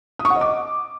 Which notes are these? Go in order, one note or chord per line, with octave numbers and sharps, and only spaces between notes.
D#6
C#6
F#5
D#5
D6